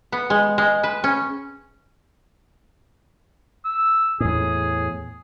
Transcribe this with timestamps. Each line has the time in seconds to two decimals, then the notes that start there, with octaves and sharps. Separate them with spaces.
0.12 B3
0.30 G#3
0.58 G#3
0.83 B4
1.04 C#4
3.65 E6
4.20 E2 A2 G#4